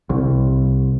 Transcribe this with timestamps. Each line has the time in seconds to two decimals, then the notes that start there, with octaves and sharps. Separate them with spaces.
0.10 C2